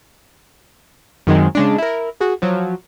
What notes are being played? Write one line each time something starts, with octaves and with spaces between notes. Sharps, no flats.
F#2 D#3 G#3 C4
C#3 G#3 D4
E4 A#4
F#4 G#4
F3 F#3